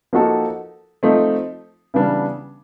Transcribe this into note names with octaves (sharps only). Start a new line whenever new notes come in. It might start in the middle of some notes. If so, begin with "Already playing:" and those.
F3 A#3 D#4 F#4 A4
F3 A3 C4 D#4
C#3 E3 G3 B3 D4